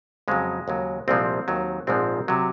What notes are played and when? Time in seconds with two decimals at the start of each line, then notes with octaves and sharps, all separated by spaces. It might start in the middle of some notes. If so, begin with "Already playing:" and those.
0.28 F2 C#3 F#3 G#3
0.68 D#2 C#3 F#3
1.08 C2 A#2 F3 G#3 C4
1.48 D#2 D#3 F#3
1.87 A#1 G#2 F3 G#3 C4
2.28 C3 F#3